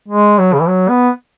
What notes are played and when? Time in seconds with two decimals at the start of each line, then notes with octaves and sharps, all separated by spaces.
0.08 G#3
0.38 F#3
0.53 C#3
0.60 E3
0.69 F#3
0.89 B3